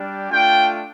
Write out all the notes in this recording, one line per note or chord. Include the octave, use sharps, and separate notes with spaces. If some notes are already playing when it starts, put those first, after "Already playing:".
Already playing: G3 D4 G4
A3 D4 F4 G5